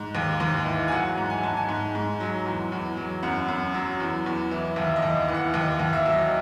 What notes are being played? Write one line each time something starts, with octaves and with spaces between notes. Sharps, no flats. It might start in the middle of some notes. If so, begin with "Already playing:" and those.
Already playing: G#2
D#2
D#2
E3
G#5
F#3 F#5
G#2
G#5
G#2 A5
G#5
G#2
G#2
F#3
E2
E2
F#3
F#2 F#5
F#2
F#3
E2
E2
E3
D#2 E5
D#5
D#2
E3
F#5
D#2 F#5
D#2
E5
F#3
D#5